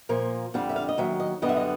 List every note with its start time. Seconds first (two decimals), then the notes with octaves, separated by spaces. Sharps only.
0.09 A#2 F3 A#3
0.54 F2 D3 G3 F5
0.69 E5
0.76 F5
0.89 D#5
0.97 D#2 D#3 F#3 E5
1.20 D#5
1.42 F#2 D3 G3 B3 D#5
1.49 E5
1.57 D#5